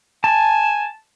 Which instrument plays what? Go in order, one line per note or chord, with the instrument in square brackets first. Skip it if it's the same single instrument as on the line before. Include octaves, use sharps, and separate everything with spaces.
[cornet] G#5 [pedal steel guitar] A5